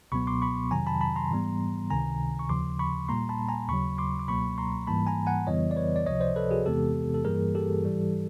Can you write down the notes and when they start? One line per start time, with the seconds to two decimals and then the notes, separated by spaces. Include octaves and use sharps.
0.12 C#2 B2 F#3 B3 B5 C#6
0.27 C6 D6
0.42 B5 C#6
0.71 F2 C3 D#3 F#3 G#5 A#5
0.87 A5 B5
1.01 A5 B5
1.16 A#5 C6
1.31 G#2 E3 G3 B3
1.90 C#2 C3 D#3 G#5 A#5
2.39 C#6
2.49 D#2 C#3 F3 C6 D6
2.79 B5 C#6
3.09 A#2 G3 A#3 A#5 C6
3.29 A5 B5
3.49 G#5 A#5
3.68 D#2 C#3 F#3 B5 C#6
3.98 C6 D6
4.19 D6
4.28 C#2 B2 F#3 A#3 B5 C#6
4.58 A#5 C6
4.87 G#2 E3 G3 A#3 A5 B5
5.07 G#5 A#5
5.26 F#5 G#5
5.47 F2 C#3 E3 G3 B3 C#5 D#5
5.71 D5
5.76 B4 C#5
5.96 D5
6.06 C#2 C3 F3 C#5 D#5
6.21 C5 D5
6.36 A4 B4
6.51 F#4 G#4
6.66 E2 C3 E3 G#3 B3 G4 A4
7.14 A4
7.25 G2 E3 G3 A#3 G#4 A#4
7.55 G4 A4
7.84 G#2 E3 G3